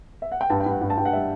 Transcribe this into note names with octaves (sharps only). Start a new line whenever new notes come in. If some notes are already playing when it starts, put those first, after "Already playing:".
E5
F#5
G5
G2 A5
G5
G2 F#5
G2
A5
G2 G5
F#5
G3 E5